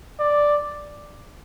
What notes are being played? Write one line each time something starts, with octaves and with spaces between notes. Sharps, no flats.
D5